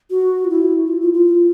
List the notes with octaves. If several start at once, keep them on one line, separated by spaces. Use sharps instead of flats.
F#4
F4
E4
F4
F4
F4